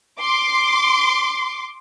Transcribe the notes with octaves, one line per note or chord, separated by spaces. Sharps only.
C6 D6